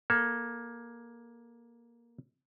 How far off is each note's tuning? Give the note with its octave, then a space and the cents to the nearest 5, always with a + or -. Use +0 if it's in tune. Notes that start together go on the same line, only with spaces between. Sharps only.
A#3 +15 A4 +0